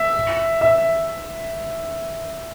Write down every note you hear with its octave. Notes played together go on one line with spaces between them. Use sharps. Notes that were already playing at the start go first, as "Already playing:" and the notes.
Already playing: E5
E5